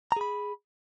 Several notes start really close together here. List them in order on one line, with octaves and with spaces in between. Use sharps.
A#5 G#4 B5